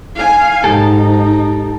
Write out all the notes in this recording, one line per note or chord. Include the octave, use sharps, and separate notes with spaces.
F5 G#5
G#2 D#4 G4 A4